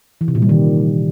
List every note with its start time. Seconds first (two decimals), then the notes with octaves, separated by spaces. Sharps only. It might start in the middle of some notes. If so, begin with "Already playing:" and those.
0.21 E3
0.28 C3
0.35 A#2
0.42 G3
0.49 D#3